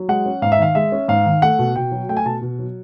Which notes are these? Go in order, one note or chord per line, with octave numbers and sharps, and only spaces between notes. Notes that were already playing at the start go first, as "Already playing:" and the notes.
Already playing: F#3
G#3 F#5
C#4
G#2 F5
E5
D#3 F5
G#3 E5
C#4
G#2 F5
D#3
A3 F#5
B2
B2 G5
F#3
A3 G5
G#5
B2 A5
B2
F#3